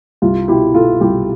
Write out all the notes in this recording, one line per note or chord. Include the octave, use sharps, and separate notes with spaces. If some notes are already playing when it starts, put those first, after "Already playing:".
C2 F4
B2 E4 G4
B2 F4 A4
C2 E4 G4